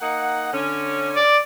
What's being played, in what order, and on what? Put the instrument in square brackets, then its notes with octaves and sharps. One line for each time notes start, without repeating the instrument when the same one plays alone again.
[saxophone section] A#3 D#4 F#5
D3 C#4
[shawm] D5